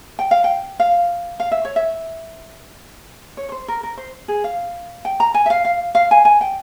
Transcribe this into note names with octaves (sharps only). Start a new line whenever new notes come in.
G5
F5
G5
F5
F5
E5
C#5
E5
C#5
C#5
C5
A#4
A#4
C5
G#4
F5
G5
A#5
G#5
E5
F5
F5
F5
G#5
G#5
G5